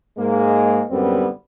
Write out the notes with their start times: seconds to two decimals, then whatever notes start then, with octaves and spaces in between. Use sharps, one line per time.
0.19 G#2 G#3 A#3
0.91 F#2 A2 D3 G3 B3 C4